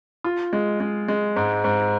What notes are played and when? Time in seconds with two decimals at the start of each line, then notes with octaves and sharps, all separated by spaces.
0.24 F4
0.53 G#3
0.80 G#3
1.08 G#3
1.36 G#2
1.64 G#2